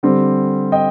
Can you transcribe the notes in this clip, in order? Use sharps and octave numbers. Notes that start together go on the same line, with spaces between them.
D3 G3 C4
D#5 G5